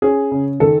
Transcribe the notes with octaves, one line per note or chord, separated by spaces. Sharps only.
C#4 G#4
C#3
D#3 A4